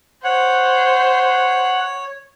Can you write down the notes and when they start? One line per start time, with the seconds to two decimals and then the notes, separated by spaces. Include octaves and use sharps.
0.24 C5 C#5 F#5